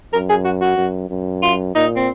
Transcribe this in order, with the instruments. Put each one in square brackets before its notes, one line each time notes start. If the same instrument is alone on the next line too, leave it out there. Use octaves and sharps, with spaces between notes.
[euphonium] F#2 [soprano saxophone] A#4
[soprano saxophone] G#4
F#4
F#4
[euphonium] F#2
F#2
[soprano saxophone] F4
[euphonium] A#2 [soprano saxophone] D#4
[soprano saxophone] C4